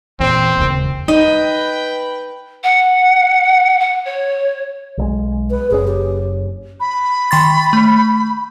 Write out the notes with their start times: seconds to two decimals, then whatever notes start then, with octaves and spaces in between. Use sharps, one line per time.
0.20 E2 A#2 C4
0.58 E1 D#2 C#3
1.08 D#4 B4 D#5 G5
2.64 F#5
3.80 F#5
4.05 C#5
4.98 B1 F#3 G#3
5.51 B4
5.71 F#1 C#4 G#4
5.88 G4
6.80 B5
7.31 D#3 C6 A6
7.73 A3